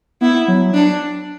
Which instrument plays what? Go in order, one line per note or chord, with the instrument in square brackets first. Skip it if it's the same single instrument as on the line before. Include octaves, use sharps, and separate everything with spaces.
[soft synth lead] B3 [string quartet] E4
[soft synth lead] F#3
[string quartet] D4